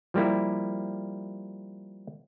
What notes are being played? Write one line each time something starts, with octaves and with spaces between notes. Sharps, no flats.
F3 G3 A#3 E4